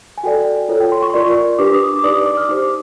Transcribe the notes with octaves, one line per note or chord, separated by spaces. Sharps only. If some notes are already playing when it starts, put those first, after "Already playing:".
G#5
F#4 A4 D5 G5
F4 A4 C#5
G5
C6
C#6
C6
F4 A#4 D5 C#6
D4 G4 B4 D6
D#6
D6
D6
D#4 G4 B4 D5 D#6
D#6
D6
F6
D#4 G4 C5 D6